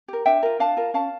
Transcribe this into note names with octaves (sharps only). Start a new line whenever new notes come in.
G4 A#4
D4 E5 G5
F4 A#4
D4 F5 A5
F4 A#4
C#4 F5 A5